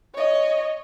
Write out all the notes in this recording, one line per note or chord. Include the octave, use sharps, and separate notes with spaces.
C#5 D#5